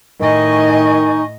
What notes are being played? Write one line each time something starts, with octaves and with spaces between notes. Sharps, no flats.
A2 D#3 D#4 D#5 G#5 C#6